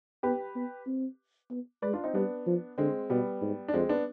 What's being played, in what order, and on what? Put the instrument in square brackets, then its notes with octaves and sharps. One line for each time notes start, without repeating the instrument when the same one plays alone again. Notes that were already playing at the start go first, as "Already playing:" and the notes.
[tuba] B3 [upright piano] G4 B4
[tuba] B3
C4
B3
[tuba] G#3 [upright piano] B4 D5
[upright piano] D4 F4
C4 D#4
[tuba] G3 [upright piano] B3 D4
[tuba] F3
[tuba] D3 [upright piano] G#3 C4
[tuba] B2 [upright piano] G3 B3
[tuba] G#2
[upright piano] D4
[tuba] F2 [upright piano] G#3 C4
[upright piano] B3 D4